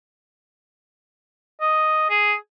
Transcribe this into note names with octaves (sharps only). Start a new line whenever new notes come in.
D#5
G#4